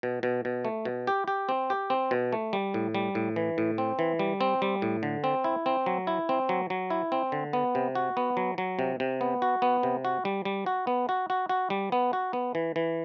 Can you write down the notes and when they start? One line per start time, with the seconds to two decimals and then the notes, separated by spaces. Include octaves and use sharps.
0.03 B2
0.23 B2
0.45 B2
0.65 A3
0.85 B2
1.07 G4
1.28 G4
1.49 C4
1.70 G4
1.90 C4
2.11 B2
2.33 A3
2.53 G3
2.74 A2
2.95 G3
3.15 A2
3.36 E3
3.58 A2
3.78 C4
3.99 E3
4.19 G3
4.41 C4
4.62 G3
4.82 A2
5.03 D3
5.24 C4
5.44 E4
5.66 C4
5.86 F#3
6.07 E4
6.29 C4
6.49 F#3
6.70 F#3
6.90 E4
7.12 C4
7.32 D3
7.53 B3
7.75 C3
7.95 F#4
8.17 B3
8.37 F#3
8.58 F#3
8.79 C3
9.00 C3
9.21 B3
9.42 F#4
9.62 B3
9.83 C3
10.05 F#4
10.25 G3
10.45 G3
10.66 F#4
10.87 B3
11.09 F#4
11.30 F#4
11.49 F#4
11.70 G3
11.92 B3
12.13 F#4
12.33 B3
12.55 E3
12.76 E3